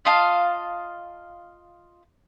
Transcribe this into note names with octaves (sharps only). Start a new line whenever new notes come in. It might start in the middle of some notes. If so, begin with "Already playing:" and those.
F4 D#5 F5 A5